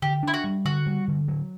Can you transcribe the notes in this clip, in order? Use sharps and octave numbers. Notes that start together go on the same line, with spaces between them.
D3 G4
D4 E4
F#4
G3
D3 F#4
G3
D3
F#3